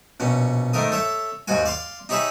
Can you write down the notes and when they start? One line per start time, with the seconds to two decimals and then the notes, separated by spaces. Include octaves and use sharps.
0.20 A#1 B2 C#4
0.73 G#2 D#3 A3 A#4 D#6
0.92 A4 C#5 E5
1.48 D#2 G#2 D#3 F#4 G#5
1.66 D5 F5 C6
2.09 D#4 G4 G#4 C#5 E5 B5